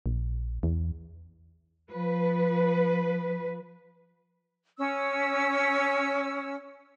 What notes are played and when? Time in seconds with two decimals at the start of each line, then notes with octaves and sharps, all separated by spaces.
0.06 A#1
0.63 E2
1.90 F3 B4
4.78 C#4 E6